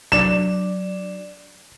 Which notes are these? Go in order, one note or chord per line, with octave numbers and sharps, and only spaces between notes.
F#3 D4 D5 E7